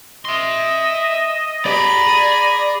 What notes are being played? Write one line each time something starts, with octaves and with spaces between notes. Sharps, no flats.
D#5 E5 C6
G4 G#4 D5 A#5 B5
G#4